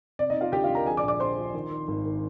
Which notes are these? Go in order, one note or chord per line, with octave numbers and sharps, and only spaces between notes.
C3 D5
D#4 D#5
C3
F4 F5
D2 G4 G5
F4 F5
D2
A#4 A#5
F3 G#4 G#5
D5 D6
A#1
D5 D6
A#1 C5 C6
F3
D#3
D#3
G#1
D#3